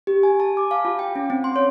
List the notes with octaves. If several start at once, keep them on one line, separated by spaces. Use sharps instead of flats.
G4
G#5
A5
D6
F5
F4
G5
C#4
C4
C6
C#5